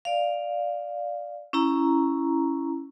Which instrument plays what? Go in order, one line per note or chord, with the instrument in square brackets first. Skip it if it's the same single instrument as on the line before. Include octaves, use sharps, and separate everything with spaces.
[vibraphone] D5 F5
C#4 E4 A#5